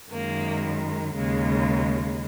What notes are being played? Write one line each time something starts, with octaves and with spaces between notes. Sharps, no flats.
F#2 D#3 G#3 A#3
D#2 C#3 G#3